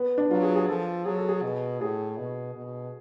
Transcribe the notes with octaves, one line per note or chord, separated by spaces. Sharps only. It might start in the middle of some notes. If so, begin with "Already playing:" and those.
Already playing: B3
D4
F#3 F4
G#4
G#4
F3 A4
F#3 G#4
A4
G#4
B2
A2 G#4
B2
B2